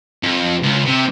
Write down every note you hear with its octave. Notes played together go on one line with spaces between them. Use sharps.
F2
C#2
C3